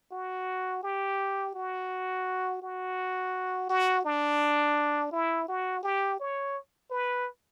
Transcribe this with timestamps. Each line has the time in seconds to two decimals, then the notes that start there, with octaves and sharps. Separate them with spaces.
0.12 F#4
0.83 G4
1.54 F#4
2.62 F#4
3.69 F#4
4.05 D4
5.12 E4
5.48 F#4
5.83 G4
6.20 C#5
6.91 B4